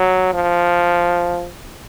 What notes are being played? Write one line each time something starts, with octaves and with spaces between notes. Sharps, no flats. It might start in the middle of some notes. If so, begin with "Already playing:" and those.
Already playing: F#3
F3